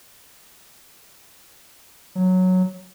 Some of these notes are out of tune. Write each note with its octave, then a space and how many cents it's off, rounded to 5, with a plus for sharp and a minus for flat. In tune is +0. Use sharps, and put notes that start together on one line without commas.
F#3 -5